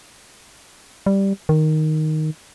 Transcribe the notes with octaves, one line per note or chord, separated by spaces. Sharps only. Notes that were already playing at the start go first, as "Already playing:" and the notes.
G3
D#3